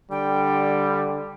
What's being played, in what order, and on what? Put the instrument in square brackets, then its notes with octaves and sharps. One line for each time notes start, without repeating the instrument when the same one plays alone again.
[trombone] D3 [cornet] G3 [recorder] G5